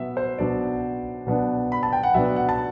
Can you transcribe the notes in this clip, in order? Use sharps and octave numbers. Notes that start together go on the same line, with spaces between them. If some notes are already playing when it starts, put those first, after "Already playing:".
Already playing: B2 F#3 B3 E5
C5
B2 F#3 B3 D4 D5
B2 F#3 B3 D4
B5
A5
G5
F#5
B2 F#3 B3 D4 E5
F#5
A5